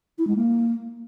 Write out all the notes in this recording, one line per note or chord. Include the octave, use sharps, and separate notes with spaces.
E4
G#3
A#3